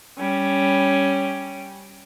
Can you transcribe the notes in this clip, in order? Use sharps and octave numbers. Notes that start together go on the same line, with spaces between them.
G3 C#4